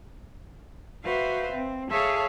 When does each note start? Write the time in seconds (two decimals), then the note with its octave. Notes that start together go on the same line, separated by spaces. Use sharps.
1.04 F#4 B4 C5 E5 F5
1.53 C4
1.91 G#4 A4 C#5 E5 F5 A5